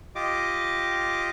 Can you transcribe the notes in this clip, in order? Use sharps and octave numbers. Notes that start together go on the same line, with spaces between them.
F4 G4 D#5 D6